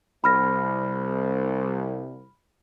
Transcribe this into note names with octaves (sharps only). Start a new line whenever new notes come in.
C2 B5 F6 A#6